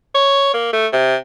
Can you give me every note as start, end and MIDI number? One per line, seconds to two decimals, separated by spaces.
0.15 0.53 73
0.54 0.69 58
0.73 0.87 57
0.93 1.16 48